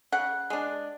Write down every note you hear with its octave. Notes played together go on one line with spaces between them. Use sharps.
C#3 F#5
G#3 D4